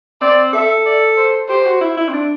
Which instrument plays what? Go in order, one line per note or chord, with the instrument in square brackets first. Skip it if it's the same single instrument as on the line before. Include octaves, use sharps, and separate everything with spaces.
[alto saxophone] C4 [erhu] D5
[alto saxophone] A4 [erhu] E5
[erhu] D5
C5
[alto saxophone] G4 [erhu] C5
[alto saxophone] F#4
E4
E4
C4
D4